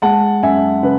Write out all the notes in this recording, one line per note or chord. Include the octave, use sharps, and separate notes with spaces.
G#3 F#5 A5
F#2 E5 G#5
C#3 B4